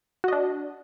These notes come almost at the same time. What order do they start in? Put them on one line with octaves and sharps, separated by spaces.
F#4 D#5 D4